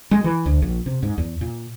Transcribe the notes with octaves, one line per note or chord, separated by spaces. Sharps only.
G#3
E3
D2
A#1
C3
G#2
E2
A#2